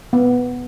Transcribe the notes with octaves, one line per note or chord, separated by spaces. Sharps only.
B3